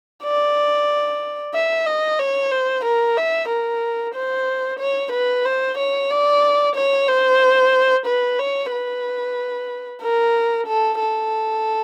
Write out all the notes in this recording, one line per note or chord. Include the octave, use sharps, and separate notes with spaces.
D5
E5
D#5
C#5
C5
A#4
E5
A#4
C5
C#5
B4
C5
C#5
D5
C#5
C5
B4
C#5
B4
A#4
A4
A4